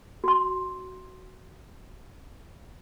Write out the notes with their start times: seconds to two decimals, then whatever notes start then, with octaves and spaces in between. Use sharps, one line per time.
0.24 F#4 C6